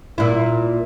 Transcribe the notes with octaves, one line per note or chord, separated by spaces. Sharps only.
A#2 E4